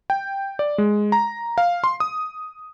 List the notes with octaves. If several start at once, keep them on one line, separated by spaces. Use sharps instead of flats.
G5
D5
G#3
A#5
F5
C6
D#6